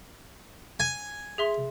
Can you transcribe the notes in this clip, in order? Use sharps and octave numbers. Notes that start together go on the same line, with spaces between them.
G#5
G#4 E5 C6